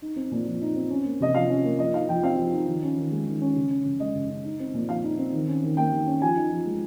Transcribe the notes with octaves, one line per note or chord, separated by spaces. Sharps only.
D#4
C4
A#2
F3
D#4
C4
C#4
A#3
C3 D#5
F3 F5
C#4
A#3
F3 D#5
D#4 F5
F3 G5
C4 F5
F3
D#4
D#3
C#4
D#3
G#3
D#3
C#4
C#3
C#4
C#3
G#3 D#5
C#3
C#4
D#4
C4
A#2
F3 F5
D#4
C4
D#3
C#4
D#3
A#3 G5
D#3
C#4
F3 G#5
D#4
F3
G#3